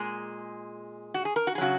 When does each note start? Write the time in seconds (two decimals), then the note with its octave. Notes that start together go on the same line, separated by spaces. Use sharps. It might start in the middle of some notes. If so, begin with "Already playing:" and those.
Already playing: A#2 G#3 G#4
1.14 F#4
1.25 G#4
1.36 A#4
1.47 F#4
1.55 G#4
1.58 C#3 F#3 F#4